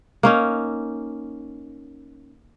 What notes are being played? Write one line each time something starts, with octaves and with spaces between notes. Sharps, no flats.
A#3 C#4 D#4